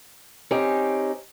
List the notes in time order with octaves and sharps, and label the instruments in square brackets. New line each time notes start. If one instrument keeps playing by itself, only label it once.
[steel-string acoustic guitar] C4 C#4 D#4 G4